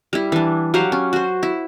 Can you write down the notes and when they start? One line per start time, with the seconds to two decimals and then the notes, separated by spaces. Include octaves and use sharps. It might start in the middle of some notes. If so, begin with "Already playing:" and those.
0.13 G3 E4
0.32 E3 D4
0.74 F#3 G4 F5 F#5
0.92 C#4
1.13 F#4 C5
1.43 E4